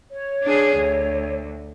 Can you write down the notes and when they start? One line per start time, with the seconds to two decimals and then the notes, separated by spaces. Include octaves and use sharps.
0.11 C#5
0.42 D4 G#4
0.77 D2